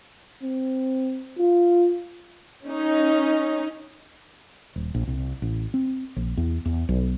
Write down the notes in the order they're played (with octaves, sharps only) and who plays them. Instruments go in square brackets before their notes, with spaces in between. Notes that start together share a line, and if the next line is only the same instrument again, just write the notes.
[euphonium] C4
F4
[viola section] C#4 D#4
[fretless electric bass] D#1
A#1
C2
A1
C4
A#1
E2
E2
B1